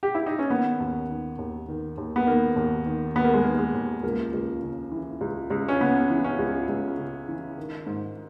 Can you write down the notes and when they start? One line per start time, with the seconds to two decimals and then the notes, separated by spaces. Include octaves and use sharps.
0.03 G4
0.15 E4
0.27 D#4
0.39 C#4
0.49 D#3 B3
0.80 D#2
1.09 D#3
1.38 D#2
1.68 D#3
1.97 D#2
2.16 B3
2.27 D#3 A#3
2.56 D#2
2.86 D#3
3.15 D#2 B3
3.24 A#3
3.34 G#3
3.43 D#3 A#3
3.59 G#3
3.74 D#2
4.03 C#2 A#3
4.34 C#2
4.62 C#3
4.92 E3
5.21 C#2
5.50 C#2
5.68 C#4
5.80 C#3 B3
6.10 E3
6.24 C#4
6.39 C#2
6.68 C#2
6.98 C#3
7.28 E3
7.57 D#3
7.87 G#2